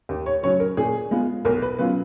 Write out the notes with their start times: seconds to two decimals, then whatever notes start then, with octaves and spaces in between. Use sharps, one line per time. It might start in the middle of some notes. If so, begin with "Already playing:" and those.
0.09 D#2
0.26 C#5
0.43 C#3 F#3 C#4 C#5
0.60 A#4
0.77 A#2 G#4
1.11 G#3 B3 F4
1.45 B1 A#4
1.62 B4
1.79 B2 F#3 C#4 F4 B4